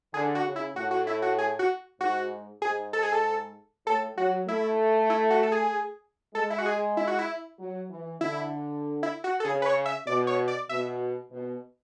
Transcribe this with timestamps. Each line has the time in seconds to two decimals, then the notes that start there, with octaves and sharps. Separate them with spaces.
0.14 D3 G#4
0.35 F#4
0.45 C#3
0.56 E4
0.76 A2 F#4
0.91 F#4
1.07 E4
1.22 F#4
1.38 G#4
1.59 F#4
1.99 G#2 F#4
2.62 G#2 G#4
2.93 A4
3.03 G#4
3.12 A4
3.86 A2 A4
4.17 F#3 F#4
4.48 A3 E4
5.10 E4
5.30 F#4
5.43 A4
5.52 G#4
6.34 G#3 A4
6.50 E4
6.58 F#4
6.66 G#4
6.97 E4
7.08 F#4
7.19 E4
7.58 F#3
7.90 E3
8.21 D3 E4
9.03 E4
9.24 F#4
9.40 A4
9.45 C#3 G#4
9.62 B4
9.66 C#5
9.86 E5
10.07 B2 D5
10.27 C#5
10.48 D5
10.69 B2 E5
11.31 B2